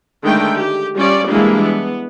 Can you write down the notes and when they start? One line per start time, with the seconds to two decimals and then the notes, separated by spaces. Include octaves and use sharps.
0.23 D3 D#3 G#3 A3 G5
0.58 G4
0.97 G3 C#4 F4 D5
1.28 E3 G3 G#3 A#3 D4 E4
1.63 B3